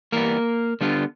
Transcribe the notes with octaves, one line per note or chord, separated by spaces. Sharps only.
E3 G3 A#3 B3 A#4
D3 G3 B3 D4 F4